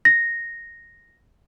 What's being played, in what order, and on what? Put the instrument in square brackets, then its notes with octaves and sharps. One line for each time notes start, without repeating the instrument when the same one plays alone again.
[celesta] A#6